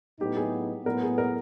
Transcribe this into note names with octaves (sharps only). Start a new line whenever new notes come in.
A2 F#3 B3 D#4 G4
G#4
A2 F#3 B3 A#4
G#4
A#4